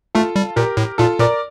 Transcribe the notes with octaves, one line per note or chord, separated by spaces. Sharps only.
A3 F4 A4
G3
A#2 G4 A#4
A2
A#2 F4 A4
A#2 A#4 D5